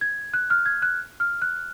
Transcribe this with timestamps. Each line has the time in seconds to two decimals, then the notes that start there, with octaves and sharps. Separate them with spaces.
0.01 G#6
0.34 F#6
0.50 F6
0.66 G#6
0.82 F#6
1.20 F6
1.42 F#6